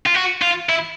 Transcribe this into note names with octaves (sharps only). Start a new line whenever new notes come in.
F4
F#4
F4
E4